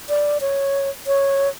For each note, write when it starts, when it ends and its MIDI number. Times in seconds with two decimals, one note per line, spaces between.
0.09 0.38 74
0.41 0.90 73
1.07 1.49 73